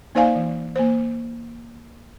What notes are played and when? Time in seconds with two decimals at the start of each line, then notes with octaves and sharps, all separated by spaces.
0.15 A#3 D#4 C5 D5 F5 G#5
0.35 E3
0.76 A#3 C5